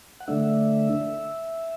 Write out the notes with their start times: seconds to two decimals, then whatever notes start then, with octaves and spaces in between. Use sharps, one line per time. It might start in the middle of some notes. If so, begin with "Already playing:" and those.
0.20 F#5
0.28 D3 A3 D4 E5